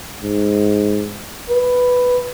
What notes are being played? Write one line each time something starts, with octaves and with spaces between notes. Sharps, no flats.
G#2
B4